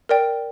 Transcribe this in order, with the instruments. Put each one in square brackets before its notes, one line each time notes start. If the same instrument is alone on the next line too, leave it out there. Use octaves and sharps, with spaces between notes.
[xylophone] A#4 D5 G5